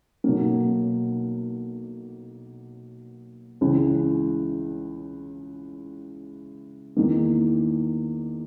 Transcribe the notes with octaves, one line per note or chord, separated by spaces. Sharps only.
B1 B2 F#3 A#3
C#2 C#3 E3
E2 D#3 A#3 D#4